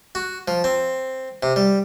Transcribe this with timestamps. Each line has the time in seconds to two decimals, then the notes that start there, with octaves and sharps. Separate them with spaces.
0.15 F#4
0.48 F3
0.64 C4
1.43 C3
1.56 G3